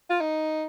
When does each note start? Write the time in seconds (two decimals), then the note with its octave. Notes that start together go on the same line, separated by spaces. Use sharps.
0.10 F4
0.21 D#4